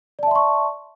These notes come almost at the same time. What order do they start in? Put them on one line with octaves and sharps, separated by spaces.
D5 A5 E5 C6 C#6